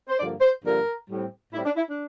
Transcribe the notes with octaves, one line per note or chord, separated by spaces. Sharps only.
C5
G2 D3 F3 A#3 D5
C5
G2 D3 F3 A#3 A#4
A2 G3 C4
A2 G3 C4 E4
D4
E4
D4